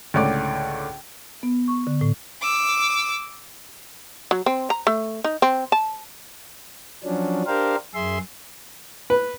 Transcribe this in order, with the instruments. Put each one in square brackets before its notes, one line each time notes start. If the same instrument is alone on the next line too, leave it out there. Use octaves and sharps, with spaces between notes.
[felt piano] C#2 A2 D3 C#5 D5 D6
[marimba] B3
C#6
D3
A2
[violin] D6 E6
[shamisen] F#3
C4
A#5
A3
D#4
C4
A5
[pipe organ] F3 F#3 C#4 D4
D4 G4 A#4 C5 F5
F#2 G#4 E5 C6
[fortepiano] B4